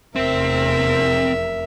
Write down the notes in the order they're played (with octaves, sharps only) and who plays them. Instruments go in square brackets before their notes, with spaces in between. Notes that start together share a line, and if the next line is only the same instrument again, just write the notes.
[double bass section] F1 E2 [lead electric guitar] C4 [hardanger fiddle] A#4 E5